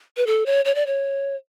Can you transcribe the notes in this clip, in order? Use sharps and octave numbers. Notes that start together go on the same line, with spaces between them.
B4
A4
C#5
C#5
D5
C#5